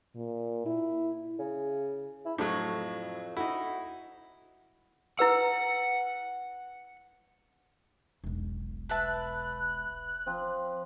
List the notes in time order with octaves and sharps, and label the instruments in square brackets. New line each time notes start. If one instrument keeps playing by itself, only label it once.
[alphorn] A#2
E4
[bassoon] C#3
E4
[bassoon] F2 [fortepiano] A2 F#3
[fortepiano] D#4 E4 [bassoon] F#4
[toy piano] E4 B4 E6 [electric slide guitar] F#5
[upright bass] E1 B1
[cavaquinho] B4 E5 A5 [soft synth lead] F#6
[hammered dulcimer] F3 C4